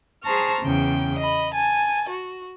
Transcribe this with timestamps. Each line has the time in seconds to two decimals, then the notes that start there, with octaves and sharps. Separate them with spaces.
0.23 G#4 C5 A5 A#5 C#6 F6
0.62 E2 C#3 G5
1.19 D#5 B5
1.52 G#5 A5
2.09 F#4